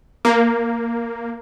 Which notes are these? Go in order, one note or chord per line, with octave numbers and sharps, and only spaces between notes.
A#3